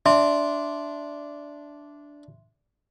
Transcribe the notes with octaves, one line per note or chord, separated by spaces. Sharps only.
D4 E5 C6